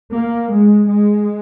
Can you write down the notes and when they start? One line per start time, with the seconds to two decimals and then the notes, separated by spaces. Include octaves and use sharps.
0.15 A#3
0.52 G#3
0.89 G#3